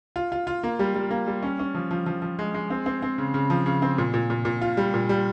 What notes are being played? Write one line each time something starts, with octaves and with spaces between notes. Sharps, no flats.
F4
F4
F4
A#3
G3
G3
A#3
G3
C#4
C#4
F3
F3
F3
F3
G#3
G#3
C4
C4
C4
C#3
C#3
F3
C#3
C4
A#2
A#2
A#2
A#2
F4
G3
A#2
G3